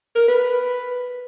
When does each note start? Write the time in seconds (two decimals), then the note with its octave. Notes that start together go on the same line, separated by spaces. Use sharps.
0.16 A#4
0.28 B4